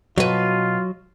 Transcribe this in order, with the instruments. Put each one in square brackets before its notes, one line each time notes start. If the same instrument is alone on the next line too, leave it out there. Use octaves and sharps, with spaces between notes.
[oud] B2 B4 [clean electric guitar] F#3 [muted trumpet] F4